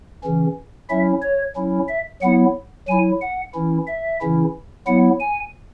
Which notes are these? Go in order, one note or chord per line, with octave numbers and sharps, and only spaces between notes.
C#3 E3 C#4
F#3 C#4 E4 E5
C#5
F#3 C#4 E4
E5
F#3 B3 E4 F#5
F#3 E4 G#5
F#5
E3 C#4 E4
E5
C#3 E3 C#4 E4
F#3 B3 E4 F#5
G#5